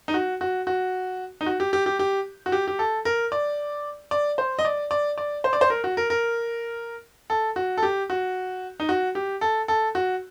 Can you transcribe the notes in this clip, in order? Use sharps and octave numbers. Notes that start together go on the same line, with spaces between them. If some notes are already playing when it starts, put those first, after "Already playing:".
D#4
F#4
F#4
F#4
D#4
F#4
G4
G4
G4
G4
F#4
G4
G4
A4
A#4
D5
D5
C5
D#5
D5
D5
D5
C5
D5
C5
A#4
F#4
A#4
A#4
A4
F#4
A4
G4
F#4
D#4
F#4
G4
A4
A4
F#4